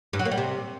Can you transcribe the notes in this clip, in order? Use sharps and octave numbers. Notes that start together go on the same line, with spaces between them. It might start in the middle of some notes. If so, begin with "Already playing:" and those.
G2
F#3
A#3
G3
C3